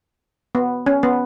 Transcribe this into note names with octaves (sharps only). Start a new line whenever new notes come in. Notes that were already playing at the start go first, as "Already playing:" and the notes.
B3
C#4
B3